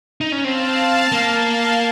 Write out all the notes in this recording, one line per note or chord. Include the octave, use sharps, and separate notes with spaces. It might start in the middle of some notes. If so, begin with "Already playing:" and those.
D#4
C#4
C4 F5 A5
A#3
F5 A5